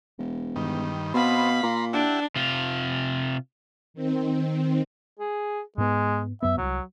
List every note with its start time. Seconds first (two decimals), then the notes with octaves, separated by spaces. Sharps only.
0.18 E1
0.56 G2 D#3
1.14 B2 B3 C4 F5 B5
1.63 A#2 A#5 C6
1.93 D4 E4 G4 F#5
2.36 C3 F4
3.94 D#3 C4
5.19 G#4
5.78 G#2 G#3 B3
6.43 F#2 B3 E5
6.58 D1 C2 F#3